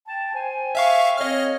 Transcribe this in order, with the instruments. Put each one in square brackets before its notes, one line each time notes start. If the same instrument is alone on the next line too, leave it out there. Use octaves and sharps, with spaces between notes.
[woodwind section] G5 A5
C5 G5 G#5
[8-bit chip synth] E5 F5 C#6
[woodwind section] C4 A4 C#5 [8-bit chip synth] D#5 F6